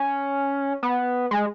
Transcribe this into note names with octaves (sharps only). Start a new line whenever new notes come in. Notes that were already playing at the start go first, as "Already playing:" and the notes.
Already playing: C#4
B3
G#3